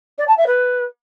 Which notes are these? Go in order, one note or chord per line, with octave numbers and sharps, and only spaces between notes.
D5
A5
E5
B4